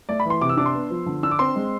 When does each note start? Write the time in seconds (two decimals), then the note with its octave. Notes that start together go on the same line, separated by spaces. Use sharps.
0.09 A3 D5
0.20 B5
0.25 E3 C6
0.41 C3 D6
0.49 E6
0.57 D4 D6
0.66 C6
0.74 B3
0.90 F3
1.06 D3
1.23 D4 E6
1.31 D6
1.39 C4 C6
1.56 G#3